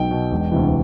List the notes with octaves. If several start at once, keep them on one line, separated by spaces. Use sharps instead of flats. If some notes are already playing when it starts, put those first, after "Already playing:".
Already playing: B1 B2 G5
B2
E1
D2 C3 E3